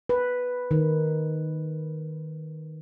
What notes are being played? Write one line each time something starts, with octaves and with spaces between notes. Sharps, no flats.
B4
D#3